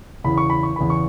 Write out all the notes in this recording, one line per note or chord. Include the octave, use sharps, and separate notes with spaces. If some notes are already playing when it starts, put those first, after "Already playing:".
E2 C#3 E3 B5
C#6
B5
C#6
E2 C#3 E3 B5
C#6